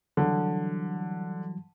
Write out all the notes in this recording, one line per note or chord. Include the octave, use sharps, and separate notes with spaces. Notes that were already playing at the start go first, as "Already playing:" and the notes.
D3 E3 F#3 G3